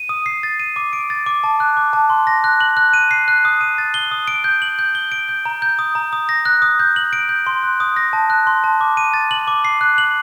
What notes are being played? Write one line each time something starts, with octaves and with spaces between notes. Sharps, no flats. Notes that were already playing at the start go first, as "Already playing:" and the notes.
Already playing: D#7
D#6
C7
A6
D#7
D6
D7
A6
D6
A5
F#6
D6
A5
C6
A#6
F#6
F#7
F#6
D#7
C7
F#6
D#6
D#7
A6
G7
D#6
D7
G6
F#7
G6
G7
D7
G6
A#5
G6
D#6
A#5
D#6
A#6
F#6
D#6
G6
F#7
D7
G6
C6
F#6
D#6
A#6
A5
F#6
C6
A5
D6
D#7
A6
F#7
D6
C7
F#6
F#7